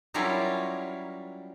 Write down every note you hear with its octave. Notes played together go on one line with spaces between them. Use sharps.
F#3 G3 C#4 E4 F4 A#4